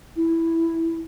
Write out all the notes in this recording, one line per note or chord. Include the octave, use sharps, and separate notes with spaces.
E4